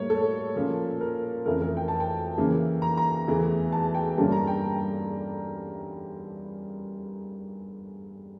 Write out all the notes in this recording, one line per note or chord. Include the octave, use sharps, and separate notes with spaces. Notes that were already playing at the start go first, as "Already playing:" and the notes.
Already playing: A2 G3 A#3 C#5
A4
A#2 F3 A#3 C#4
A#4
F2 E3 A3 C#4 A#4
A#4
G5
A5
G5
C#3 E3 A#3 C#4
A#5
A#5
E2 E3 A3
A5
G5
G2 D3 G3 A#3 C#4 A5
A#5
G5